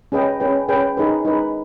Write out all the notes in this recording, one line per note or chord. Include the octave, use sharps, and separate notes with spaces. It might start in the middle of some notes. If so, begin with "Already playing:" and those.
C#4 G#4 B4 D#5 G5
C#4 G#4 B4 G5
C#4 G#4 B4 G5
D#4 G#4 B4
D#4 G#4 B4